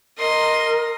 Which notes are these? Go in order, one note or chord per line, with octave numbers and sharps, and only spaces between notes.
A#4 D#5 C6